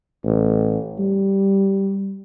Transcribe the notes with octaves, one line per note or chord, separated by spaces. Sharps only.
A1
G3